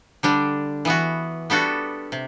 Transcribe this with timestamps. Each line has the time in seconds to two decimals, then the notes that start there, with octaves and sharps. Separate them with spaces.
0.23 D3 G3 D4
0.85 E3 B3 F#4
1.50 G3 B3 D4 F#4 A4
2.12 C3